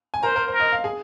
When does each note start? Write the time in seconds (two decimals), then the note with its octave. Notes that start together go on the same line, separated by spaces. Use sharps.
0.14 G#5
0.23 A#4 C5 A#5
0.36 A#4
0.48 C5
0.53 A#4
0.60 D#5
0.72 F5
0.84 G#4 G#5